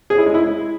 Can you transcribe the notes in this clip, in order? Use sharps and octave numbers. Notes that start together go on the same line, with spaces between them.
G#4
E4
G#3
E4